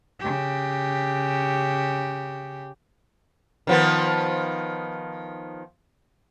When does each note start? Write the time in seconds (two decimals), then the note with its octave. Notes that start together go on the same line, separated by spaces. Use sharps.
0.20 C#3 G4
3.67 D#3 F3 B3